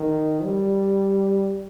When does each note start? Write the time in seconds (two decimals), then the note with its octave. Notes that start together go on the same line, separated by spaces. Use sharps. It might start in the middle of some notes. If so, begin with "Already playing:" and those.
Already playing: D#3
0.43 G3